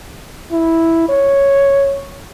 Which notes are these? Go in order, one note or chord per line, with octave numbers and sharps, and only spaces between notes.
E4
C#5